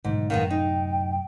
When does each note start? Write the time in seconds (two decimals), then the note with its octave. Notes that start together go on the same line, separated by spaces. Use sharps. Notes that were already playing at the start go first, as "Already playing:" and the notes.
0.04 B1 G#2 D3 D#3
0.30 F#2 A2 C3 D#3 G#3 B3 F5
0.51 D#4 G5